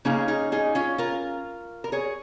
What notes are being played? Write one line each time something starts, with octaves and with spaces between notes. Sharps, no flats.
C#3 A#3 C#4 D#4 G#4
D#4 G#4
D#4 G#4
C#4 F4
F4 A#4
A#4
G#4 C#5